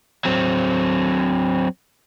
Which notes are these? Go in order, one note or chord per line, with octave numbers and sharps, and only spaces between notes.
F#3 C4